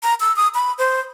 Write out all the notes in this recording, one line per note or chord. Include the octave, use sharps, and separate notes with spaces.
A#5
E6
D#6
B5
C5